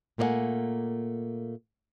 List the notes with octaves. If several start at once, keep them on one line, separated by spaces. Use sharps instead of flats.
A#2 A3 A#3 D5 F#5 G#5